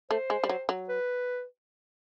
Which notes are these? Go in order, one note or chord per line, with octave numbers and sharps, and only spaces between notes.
A3 C5
G#3
G3
F#3
F#3
B4